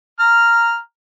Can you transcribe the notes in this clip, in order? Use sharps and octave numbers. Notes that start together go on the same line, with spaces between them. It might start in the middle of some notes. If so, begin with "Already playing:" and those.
A#5 F6